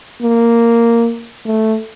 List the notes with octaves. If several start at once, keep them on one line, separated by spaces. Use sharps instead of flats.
A#3
A3